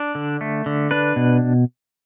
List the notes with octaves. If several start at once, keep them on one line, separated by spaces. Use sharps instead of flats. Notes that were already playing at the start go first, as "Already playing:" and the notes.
Already playing: D4
D3
A3
D3
D4 B4
B2